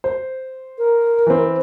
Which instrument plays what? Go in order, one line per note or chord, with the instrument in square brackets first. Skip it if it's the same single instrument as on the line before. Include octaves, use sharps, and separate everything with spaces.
[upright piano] C5
[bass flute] A#4
[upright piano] E3 C4